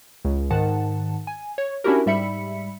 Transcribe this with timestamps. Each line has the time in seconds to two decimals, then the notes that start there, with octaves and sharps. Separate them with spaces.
0.25 C#2
0.50 G#2 D#3 F#5 A5
1.27 G#5
1.58 C#5
1.84 C#4 D4 E4 F#4 G4 A#4
2.06 G#2 G3 E5 B5 C#7